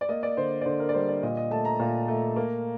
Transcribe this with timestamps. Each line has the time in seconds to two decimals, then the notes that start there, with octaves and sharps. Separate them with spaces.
0.01 D5
0.09 A#3 D#5
0.23 D5
0.37 D3 C5
0.61 D5
0.65 D3 C5
0.80 A#4
0.89 D5
0.94 G3 C5
1.09 D5
1.23 A#2 D#5
1.37 D#5
1.51 A3 A5
1.65 A#5
1.79 A#2
2.08 A3
2.36 A#3